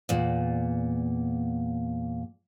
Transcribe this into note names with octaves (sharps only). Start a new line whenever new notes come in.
E2 A#2